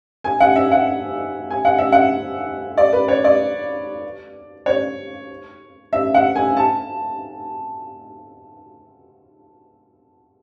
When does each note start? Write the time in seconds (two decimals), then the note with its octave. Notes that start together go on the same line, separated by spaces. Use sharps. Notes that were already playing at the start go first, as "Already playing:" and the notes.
0.24 G#5
0.40 F#5
0.56 E5
0.71 F#5
1.50 G#5
1.65 F#5
1.78 E5
1.92 F#5
2.78 D5
2.93 B4
3.08 C#5
3.24 D5
4.66 C#5
5.93 E5
6.14 F#5
6.36 G#5
6.57 A5